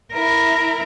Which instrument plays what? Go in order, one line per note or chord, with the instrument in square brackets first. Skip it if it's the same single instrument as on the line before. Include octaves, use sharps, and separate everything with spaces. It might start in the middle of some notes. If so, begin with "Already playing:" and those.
[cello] E4 A#4